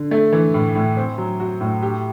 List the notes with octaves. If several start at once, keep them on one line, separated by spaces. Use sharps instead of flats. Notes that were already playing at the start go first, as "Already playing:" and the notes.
Already playing: D3
A3
E3
A2
A2
C4
F#3
F#4
A2
G4